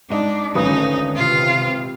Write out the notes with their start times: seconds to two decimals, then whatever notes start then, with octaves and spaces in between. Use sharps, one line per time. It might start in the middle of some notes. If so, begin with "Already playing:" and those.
0.10 G#2 D4 D#4
0.55 G#1 D3 A3 C#4 D#4 B4 D#6
1.16 C3 F4